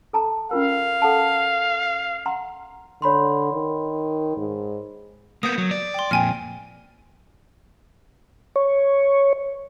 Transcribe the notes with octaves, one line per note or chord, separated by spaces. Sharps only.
A4 A5 A#5
C#4 F4 A#4 F5
A4 F#5 A5
F#5 A#5 C6
D3 C#5 B5 C6
D#3
G#2
A#3 B3 D#6 G6
F#3
D5
G5 C6
F2 A#2 G5 G#5 F6
C#5